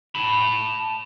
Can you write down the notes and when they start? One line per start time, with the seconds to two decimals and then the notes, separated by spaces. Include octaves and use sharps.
0.15 A5 B5